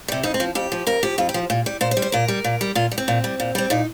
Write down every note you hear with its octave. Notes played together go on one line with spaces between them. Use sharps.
C3 G3
F2 D#4
C4
F3
F2 G4
F3
F2 A#4
F3 G4
F2 F4
G4
F3
A#2
G3
A#2 C5
C5
G3
C5
A#2 A#4
G3
A#2
G3
A#2 F4
G3
C4
A#2
G3
A#2
G3 C4
A#2 D#4